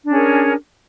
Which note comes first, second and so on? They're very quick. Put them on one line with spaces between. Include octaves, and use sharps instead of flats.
D4 C#4 G#4 A#4